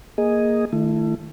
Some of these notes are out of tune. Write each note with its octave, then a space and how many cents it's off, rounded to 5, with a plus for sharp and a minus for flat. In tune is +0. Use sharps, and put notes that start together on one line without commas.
A#3 +0 G#4 +0 D#5 +0
D#3 -15 A3 +0 E4 +35